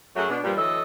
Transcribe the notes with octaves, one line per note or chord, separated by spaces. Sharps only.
F#2 F#3 A3 F#4 G#4 C#5
B2 D4
G2 A#2 F3 G3
D2 E3 F#3 A4 D#5